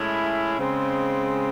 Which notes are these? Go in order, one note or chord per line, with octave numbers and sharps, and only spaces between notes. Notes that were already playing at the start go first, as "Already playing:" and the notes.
Already playing: A2 G#3 C#4 E4
C#3 G#3 C4